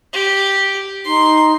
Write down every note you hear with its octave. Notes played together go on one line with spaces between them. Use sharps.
G4
D#4 C6